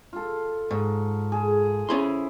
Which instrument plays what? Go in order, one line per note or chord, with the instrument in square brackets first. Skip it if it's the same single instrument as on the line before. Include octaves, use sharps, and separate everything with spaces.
[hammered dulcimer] F4 A4
[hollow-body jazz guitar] G#2 [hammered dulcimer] C#6
[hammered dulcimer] G#4 A5
[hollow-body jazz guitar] C#4 G#4 C6 [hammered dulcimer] E4 C5